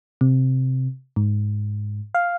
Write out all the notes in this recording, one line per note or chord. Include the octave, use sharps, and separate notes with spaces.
C3
G#2
F5